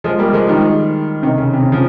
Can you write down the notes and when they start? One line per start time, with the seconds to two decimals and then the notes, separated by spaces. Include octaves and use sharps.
0.04 F3 G#3
0.19 G3 A#3
0.33 F3 G#3
0.48 D#3 G3
1.23 C3 D#3
1.38 C#3
1.53 C3
1.62 C#3
1.72 C#3 F3